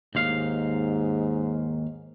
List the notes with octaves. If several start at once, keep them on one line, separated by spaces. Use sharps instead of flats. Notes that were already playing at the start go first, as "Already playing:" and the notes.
D#2 G#2 F5